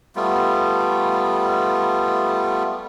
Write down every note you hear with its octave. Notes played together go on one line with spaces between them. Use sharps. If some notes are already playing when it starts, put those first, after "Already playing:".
G3 A3 B3 F4